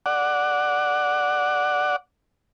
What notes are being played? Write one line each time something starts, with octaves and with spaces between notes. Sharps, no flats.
D5 F#5